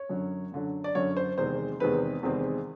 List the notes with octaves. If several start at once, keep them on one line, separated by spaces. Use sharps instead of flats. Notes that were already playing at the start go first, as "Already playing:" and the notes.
Already playing: C#5
F#2 D3 F#3
F#2 D3 F#3
D5
F#2 D3 F#3 C#5
C5
E2 C3 D#3 G#3 C4 C5
E2 C3 D#3 G#3 C4 B4
E2 C3 D#3 G#3 C4